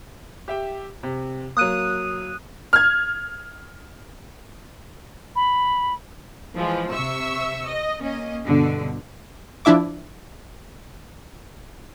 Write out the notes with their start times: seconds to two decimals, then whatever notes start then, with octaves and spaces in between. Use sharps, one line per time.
0.48 G4 E5 G5
1.03 C3
1.57 F#3 A#3 D#6 F#6 D#7
2.73 F6 G#6
5.36 B5
6.55 E3 F3 G#3
6.91 C3 E5 C#6 E6
7.66 D#5
8.01 A#3 C#4 D#5
8.46 G2 B2 D3
9.65 F3 D4 E4 E5 D6